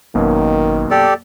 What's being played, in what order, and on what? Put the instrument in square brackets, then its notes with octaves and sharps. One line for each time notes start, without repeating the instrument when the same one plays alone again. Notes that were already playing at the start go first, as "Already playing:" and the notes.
[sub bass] G#1 [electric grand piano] F#2 B2 A#3 [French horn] D#3
[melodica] G4 A4 D5